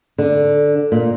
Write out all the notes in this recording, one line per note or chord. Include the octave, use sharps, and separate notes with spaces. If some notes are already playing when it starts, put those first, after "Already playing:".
D3
A#2